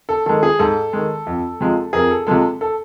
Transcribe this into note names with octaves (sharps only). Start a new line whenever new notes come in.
A4
D#3 G#3 A4
G#4
G#2 A4
D#3 G#3
F2
C3 F3 G#3
F2 G#4 A#4
A4
C3 F3 G#3 A4
A4